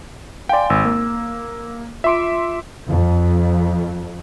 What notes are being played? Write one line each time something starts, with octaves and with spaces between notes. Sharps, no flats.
D5 F5 G5 G#5 C6
G#1 E6
A#3
F4 E5 C6 D6 D7
F2